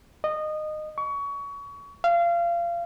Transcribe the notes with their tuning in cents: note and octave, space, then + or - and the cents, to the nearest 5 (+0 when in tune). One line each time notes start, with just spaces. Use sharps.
D#5 -20
C#6 +25
F5 -25